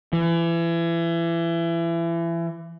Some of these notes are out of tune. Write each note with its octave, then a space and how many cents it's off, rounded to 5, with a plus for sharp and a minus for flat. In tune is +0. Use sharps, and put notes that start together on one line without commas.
E3 +30